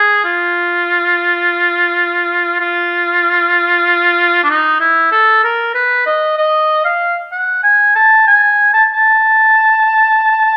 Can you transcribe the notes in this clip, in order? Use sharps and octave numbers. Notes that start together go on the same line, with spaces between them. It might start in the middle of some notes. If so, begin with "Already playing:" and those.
Already playing: G#4
F4
F4
D4
D#4
E4
A4
A#4
B4
D#5
D#5
F5
F#5
G#5
A5
G#5
A5
A5